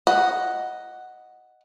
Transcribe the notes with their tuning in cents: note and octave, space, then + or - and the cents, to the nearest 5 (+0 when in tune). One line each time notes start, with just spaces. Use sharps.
D#5 +0 F#5 +0